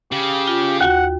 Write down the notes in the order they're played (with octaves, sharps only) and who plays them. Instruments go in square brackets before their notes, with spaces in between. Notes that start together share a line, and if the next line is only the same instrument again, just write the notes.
[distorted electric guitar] C#3 [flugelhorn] G4
[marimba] F4
[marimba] D#2 F#4 G5 [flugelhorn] F#5